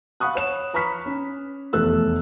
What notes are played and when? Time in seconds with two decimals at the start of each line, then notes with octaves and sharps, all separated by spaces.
0.20 F5 F#5 B5 C#6 D#6 F#6
0.35 C#5 E7
0.74 B4 A#5 B5 C#6 F6 B6
1.06 C#4
1.73 F1 E2 A3 A4 E6 F#6